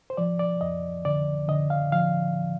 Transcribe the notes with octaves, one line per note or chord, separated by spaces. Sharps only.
C5
F3 D5
D5
F2 D#5
D3 D5
D3 D#5
F5
F3 F5